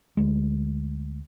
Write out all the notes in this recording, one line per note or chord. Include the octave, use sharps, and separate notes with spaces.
D2 G#3